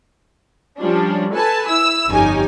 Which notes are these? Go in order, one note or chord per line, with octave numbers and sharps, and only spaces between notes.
F3 G3 C#4 D4
A4 B4 G#5 A5
E4 E6
G1 F2 C#4 D#4 G4 G#5